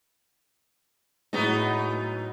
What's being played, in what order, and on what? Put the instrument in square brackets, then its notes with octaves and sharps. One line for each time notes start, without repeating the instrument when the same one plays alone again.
[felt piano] A2 G#3 [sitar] F#3 B3 D#4